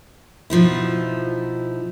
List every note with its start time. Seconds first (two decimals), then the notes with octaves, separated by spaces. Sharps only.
0.50 B2 F3 D#4 E4